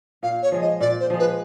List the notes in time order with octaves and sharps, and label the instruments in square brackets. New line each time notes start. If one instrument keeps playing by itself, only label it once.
[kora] A#2 [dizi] F5
[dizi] C#5
[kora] F3 G#3
[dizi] D#5
[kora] A#2 [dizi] D5
[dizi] C5
[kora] F3 G#3
[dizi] B4